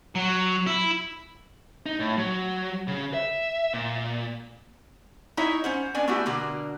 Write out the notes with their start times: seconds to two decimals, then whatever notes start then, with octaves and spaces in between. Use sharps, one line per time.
0.15 F#3
0.66 E4
1.86 D#4
2.00 A2
2.17 F#3
2.88 C#3
3.14 E5
3.74 A#2
5.37 D#4 E4 C#5 D#5 E5
5.64 C#4 C5 F#5
5.94 B3 C#4 D4 D5 G#5
6.08 A3 B3 E4 F#4 G4
6.26 B2 D3 A#3 F#4